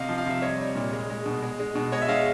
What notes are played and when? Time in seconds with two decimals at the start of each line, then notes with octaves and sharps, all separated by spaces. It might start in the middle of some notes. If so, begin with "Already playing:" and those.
Already playing: C3 D#5 F5
0.09 F3
0.18 F5
0.26 C3 E5
0.42 G3 C#5 D#5
0.60 G3
0.75 A#2
0.93 G#3
1.10 G#3
1.26 B2
1.42 G#3
1.59 G#3
1.75 B2
1.92 G#3 C#5 D#5
2.02 E5
2.08 G#3 D#5 F5